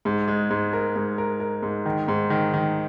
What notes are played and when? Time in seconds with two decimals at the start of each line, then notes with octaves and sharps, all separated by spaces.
0.05 G#2
0.28 G#3
0.50 G#2
0.73 A#4
0.96 G#2
1.18 A#4
1.40 A#4
1.63 G#2
1.86 D#3
2.08 G#2
2.30 D#3
2.54 D#3